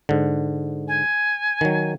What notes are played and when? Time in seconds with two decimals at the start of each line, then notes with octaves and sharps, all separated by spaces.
0.09 G#2 D3
0.88 G#5
1.61 D#3 F#3